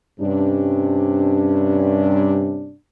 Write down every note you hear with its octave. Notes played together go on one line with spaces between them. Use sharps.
G2 C3 C#4 D4